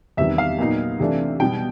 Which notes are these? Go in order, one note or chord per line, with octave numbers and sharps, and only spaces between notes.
E2 C3 D#3 G3 E5
F5
A#2 F#3 B3 D#4
C3 E3 A3 D4
B2 G3 B3 G5